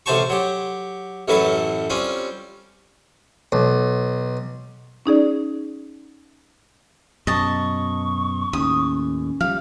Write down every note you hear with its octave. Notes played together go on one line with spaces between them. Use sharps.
A1 C3 F#4 C5 A5 C#6
F#3 G4
A1 F#2 E3 F#3 A4 B4
G3 C4 C#4 F4
B1
C#4 D#4 G#4 D5
F#2 B2 D#5 A5 C#6
D#2 A2 C#4 D#6
F3 G3 F5